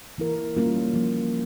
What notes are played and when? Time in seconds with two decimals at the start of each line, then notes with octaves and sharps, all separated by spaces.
0.18 E3 A#3 E4 A#4
0.56 G3 A#3 C#4 F4 A#4
0.94 F3 A#3